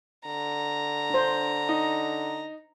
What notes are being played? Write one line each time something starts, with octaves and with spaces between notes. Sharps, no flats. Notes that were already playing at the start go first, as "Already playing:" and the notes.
D3 A#5
D4 C5
D#4